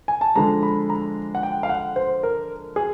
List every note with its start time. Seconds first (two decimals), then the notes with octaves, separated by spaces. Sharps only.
0.08 G#5
0.21 A5
0.36 D3 F3 G#3 A#5
0.63 B5
0.90 A#5
1.35 F#5
1.43 G5
1.63 F5
1.69 F#5
1.96 C5
2.23 A#4
2.76 G#4